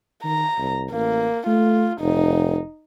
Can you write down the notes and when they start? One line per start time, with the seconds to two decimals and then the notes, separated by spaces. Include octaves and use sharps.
0.24 D#3 A#5
0.59 C2
0.92 A1 A#3
1.47 A3 F4
2.00 F1 D#4